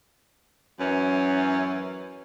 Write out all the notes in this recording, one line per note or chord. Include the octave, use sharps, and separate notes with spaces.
F#2 E3 C#4